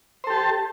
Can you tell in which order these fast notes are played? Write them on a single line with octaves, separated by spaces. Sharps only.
C5 A4 G4 A5